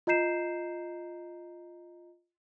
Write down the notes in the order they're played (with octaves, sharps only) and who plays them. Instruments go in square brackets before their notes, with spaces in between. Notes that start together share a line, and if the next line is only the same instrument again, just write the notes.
[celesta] F4 D#5 A#5 G6 C7 E7